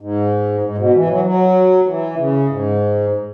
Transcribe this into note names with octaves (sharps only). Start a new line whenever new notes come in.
G#2
G#2
B2
E3
F#3
F#3
E3
C#3
G#2